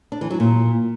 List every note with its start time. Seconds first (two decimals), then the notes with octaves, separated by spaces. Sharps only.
0.12 D4
0.21 E3
0.30 F#3
0.40 A#2